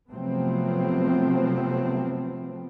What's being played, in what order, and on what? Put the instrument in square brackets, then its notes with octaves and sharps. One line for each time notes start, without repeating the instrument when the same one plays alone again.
[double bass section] C3 F3 F#3 A3 B3 C4